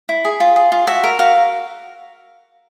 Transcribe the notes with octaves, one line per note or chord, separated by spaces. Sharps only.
E4
G#4
F4
G#4
F4
F#4 E5
A#4
F#4 F5